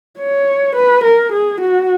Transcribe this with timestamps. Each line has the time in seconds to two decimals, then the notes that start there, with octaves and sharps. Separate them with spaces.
0.19 C#5
0.76 B4
1.04 A#4
1.32 G#4
1.61 F#4